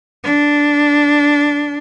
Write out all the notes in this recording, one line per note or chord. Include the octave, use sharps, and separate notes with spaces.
D4